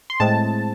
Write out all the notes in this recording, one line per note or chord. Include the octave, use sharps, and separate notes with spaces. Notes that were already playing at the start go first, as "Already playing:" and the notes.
C6
A2 G#3 C4 A5